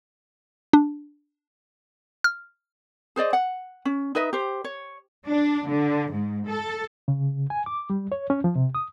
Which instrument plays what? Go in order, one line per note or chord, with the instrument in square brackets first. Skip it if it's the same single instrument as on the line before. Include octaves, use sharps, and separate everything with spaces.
[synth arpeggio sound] D4
F6
[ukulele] G#4 C5 D5 D#5
F#5
C#4
D#4 B4 D#5 E5
G4 C5
C#5
[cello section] D4
D3
G#2
A4
[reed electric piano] C#3
G#5
D6
G3
C#5
C#4
F3
C3
D#6